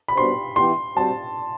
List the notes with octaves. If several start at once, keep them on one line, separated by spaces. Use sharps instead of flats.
B5
G3 B3 D4 F#4 C5 C6
E3 B3 E4 G4 C6
G3 C4 F#4 C5 A5